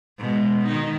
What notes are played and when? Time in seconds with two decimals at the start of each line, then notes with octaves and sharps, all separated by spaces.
0.19 B2 G#3
0.67 D#3 D#4